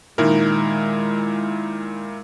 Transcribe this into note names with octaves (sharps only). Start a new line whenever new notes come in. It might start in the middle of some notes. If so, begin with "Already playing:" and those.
A#2 D#3 G#3 E4 A#4